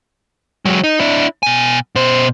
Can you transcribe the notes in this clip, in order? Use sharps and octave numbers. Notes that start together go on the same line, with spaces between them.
F#3 G#3
D#4
D4 E4
B2 G#5
B2 C5